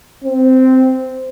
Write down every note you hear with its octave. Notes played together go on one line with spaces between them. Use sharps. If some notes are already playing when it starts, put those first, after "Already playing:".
C4